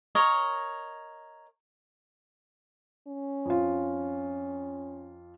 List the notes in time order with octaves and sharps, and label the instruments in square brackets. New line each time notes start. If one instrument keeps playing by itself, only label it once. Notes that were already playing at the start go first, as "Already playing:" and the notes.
[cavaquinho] A#4 C#5 D#5
[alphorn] C#4
[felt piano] F2 F4